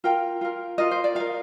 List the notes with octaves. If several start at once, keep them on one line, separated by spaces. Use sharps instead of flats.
F4 A#4 G5
F4 A#4
F4 A#4 D#5
C5
D5
F4 A#4 F5